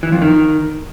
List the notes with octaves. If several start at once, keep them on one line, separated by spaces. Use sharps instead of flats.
E3
F2
D#3